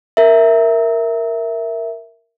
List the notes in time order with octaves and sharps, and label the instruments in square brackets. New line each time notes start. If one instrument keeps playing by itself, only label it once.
[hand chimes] A#4 E5